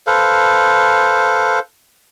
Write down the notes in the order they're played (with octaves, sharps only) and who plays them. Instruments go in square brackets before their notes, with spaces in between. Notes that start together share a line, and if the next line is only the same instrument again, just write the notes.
[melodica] A4 B4 C5 F5